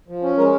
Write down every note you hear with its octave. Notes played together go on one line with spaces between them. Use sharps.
F3
C#4
G#3 A#4